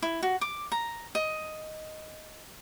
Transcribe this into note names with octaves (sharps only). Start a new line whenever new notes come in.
E4
F#4
D6
A#5
D#5